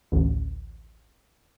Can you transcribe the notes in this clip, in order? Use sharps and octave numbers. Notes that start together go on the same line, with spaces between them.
A1 D2